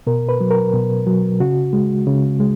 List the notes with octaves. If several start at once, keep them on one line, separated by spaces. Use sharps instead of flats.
B2 A#4
B4
F#3
A#4
B2
F#3
C#3 F#4
G#3
C#3
G#3